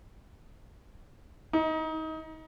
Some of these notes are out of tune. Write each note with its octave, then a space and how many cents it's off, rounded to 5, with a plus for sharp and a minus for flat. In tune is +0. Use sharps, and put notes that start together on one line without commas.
D#4 +25